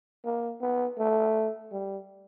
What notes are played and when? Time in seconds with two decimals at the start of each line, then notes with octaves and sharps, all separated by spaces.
0.25 A#3
0.61 B3
0.98 A3
1.72 G3